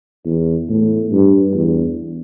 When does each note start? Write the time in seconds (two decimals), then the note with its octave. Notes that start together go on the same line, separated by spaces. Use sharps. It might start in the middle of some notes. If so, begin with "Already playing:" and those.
0.25 E2
0.69 A2
1.12 G2
1.55 E2